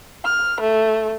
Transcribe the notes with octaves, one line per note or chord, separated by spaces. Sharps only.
F6
A3